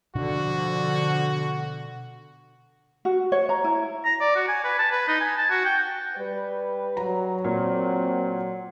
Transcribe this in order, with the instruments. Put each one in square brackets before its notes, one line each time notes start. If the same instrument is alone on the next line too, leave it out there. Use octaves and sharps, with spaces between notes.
[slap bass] B2 D4 [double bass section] D3 F3 [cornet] F#4
[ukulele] F#4
C#5
A#5
E4
[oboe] A#5
D5
F#4
G#5
B4
A5
B4
D#4
G#5
A5
F#4
G5
[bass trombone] G3 [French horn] B4
[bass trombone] F#3 [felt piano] A#5
[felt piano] A#2 [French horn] C4